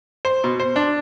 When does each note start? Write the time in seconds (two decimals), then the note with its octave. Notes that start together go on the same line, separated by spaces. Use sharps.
0.25 C5
0.44 B2
0.60 C5
0.76 D4